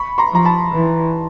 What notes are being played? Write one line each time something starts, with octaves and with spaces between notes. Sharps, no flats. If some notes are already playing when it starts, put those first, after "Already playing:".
Already playing: B5 C#6
A#5 C6
F3 A#5
A5 B5
E3